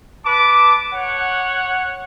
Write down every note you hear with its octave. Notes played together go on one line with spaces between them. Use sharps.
B4 A5 D6
C#5 F#5